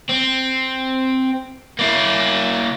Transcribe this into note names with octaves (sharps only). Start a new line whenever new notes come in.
C4
A#3 E4